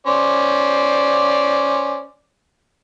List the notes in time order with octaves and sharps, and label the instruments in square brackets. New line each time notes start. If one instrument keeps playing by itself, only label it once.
[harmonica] C#4 C5 D5